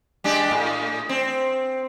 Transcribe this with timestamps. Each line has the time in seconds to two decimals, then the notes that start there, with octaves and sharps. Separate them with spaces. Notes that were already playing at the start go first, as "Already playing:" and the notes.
0.24 G#3 D4 G4
0.51 A2
1.09 C4